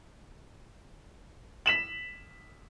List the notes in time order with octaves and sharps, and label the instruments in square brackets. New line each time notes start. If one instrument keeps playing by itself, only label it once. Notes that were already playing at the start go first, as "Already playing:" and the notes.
[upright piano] B6 E7 F#7